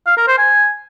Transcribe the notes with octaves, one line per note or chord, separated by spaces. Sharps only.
F5
A#4
C5
G#5